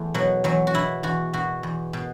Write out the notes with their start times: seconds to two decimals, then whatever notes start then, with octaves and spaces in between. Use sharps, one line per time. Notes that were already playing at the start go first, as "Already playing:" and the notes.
Already playing: E2 A3
0.14 B2 F#3
0.44 E2 F#3
0.67 F#4
0.74 B2 E4
1.03 E2 F#4
1.33 B2 F#4
1.63 E2
1.93 B2